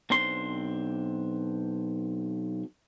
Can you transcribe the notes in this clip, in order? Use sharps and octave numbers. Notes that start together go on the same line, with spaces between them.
B1 C4 D4 C5 C6